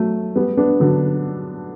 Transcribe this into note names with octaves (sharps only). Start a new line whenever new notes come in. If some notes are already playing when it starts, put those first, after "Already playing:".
Already playing: F#3 A3
G3 B3
B3 D4
D3 F#3